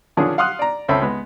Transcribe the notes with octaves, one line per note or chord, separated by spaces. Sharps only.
D3 D#3 F3 C#4 D4 G#4
F5 F#5 C6 D#6 F6 F#6
D5 A#5
C#2 C4 C#4 A4 E5 B5
G#3 B3